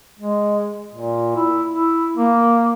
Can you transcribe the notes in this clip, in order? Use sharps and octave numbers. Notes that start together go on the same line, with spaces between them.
G#3
A#2
E4
E4
A#3